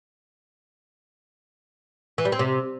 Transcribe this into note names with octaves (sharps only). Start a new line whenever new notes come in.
E3
G3
C4
C3